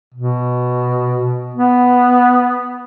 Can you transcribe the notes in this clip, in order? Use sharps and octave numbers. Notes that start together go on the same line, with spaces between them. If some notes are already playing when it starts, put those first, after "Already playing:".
B2
B3